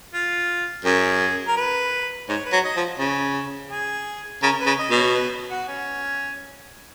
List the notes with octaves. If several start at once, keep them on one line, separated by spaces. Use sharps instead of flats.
F4
F#2 G#4
A#4
B4
G#2 C#5
B4
F#3
D#5
F3
C#3
G#4
C#3 A#4
B4
C#3
D#5
B2
C#5
B4
F#4
C#4